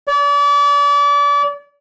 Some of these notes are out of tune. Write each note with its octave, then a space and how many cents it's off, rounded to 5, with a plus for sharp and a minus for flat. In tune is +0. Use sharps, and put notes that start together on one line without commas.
D5 -35